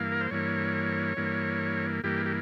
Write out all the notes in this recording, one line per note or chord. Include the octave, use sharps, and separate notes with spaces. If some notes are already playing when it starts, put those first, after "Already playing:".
Already playing: G2 E3 A#3 F5
A#4
C5
G2 E3 A#3 C#5
G2 E3 A#3
G2 E3 A#3 G4
G4